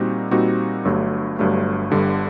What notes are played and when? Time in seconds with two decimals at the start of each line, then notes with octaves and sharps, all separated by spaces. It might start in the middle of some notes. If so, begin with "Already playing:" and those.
Already playing: A#2 G3 C4 D#4 F#4
0.31 A#2 G3 C4 D#4 F#4
0.85 G1 G2 F#3 A3
1.39 G1 G2 F#3 A3
1.91 G1 G2 D3 G3